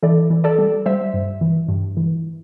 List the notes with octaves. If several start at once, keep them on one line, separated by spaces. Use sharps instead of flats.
E3 A4 D5
E3
A4 D5
G3
G3 C5 E5
G2
E3
G2
E3